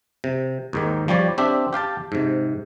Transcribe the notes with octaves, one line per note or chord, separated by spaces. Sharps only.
C3
D#2 G#2 D#3
F3 G3 G4 C#5 D5
C4 D4 G4 E5
G4 F5 G5 A5
G#2 C3